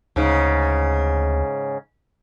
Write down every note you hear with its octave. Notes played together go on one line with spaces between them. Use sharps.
D2 G#2 C#3